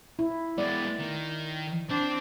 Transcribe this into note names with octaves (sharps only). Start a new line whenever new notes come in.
E4
G#3 B3 D5
D#3
C4 D4